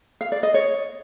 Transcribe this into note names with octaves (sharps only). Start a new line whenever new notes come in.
F5
D5
D#5
C#5